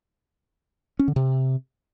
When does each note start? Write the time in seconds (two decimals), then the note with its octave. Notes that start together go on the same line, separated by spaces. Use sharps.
0.99 C#4
1.08 D3
1.16 C3